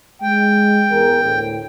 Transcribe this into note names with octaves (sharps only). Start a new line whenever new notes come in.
G#3 G5
E2 G#4 A#4
D2 A2